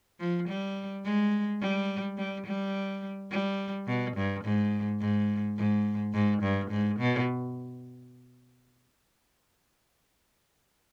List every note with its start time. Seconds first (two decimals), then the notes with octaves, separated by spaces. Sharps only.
0.20 F3
0.48 G3
1.04 G#3
1.61 G3
2.18 G3
2.46 G3
3.31 G3
3.87 B2
4.17 G2
4.44 G#2
5.01 G#2
5.58 G#2
6.14 G#2
6.42 G2
6.71 G#2
6.99 B2